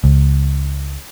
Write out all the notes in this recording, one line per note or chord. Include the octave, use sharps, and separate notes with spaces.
C#2